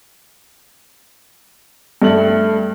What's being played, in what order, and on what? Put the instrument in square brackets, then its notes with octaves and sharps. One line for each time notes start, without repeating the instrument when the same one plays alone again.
[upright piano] G2 A3 F#7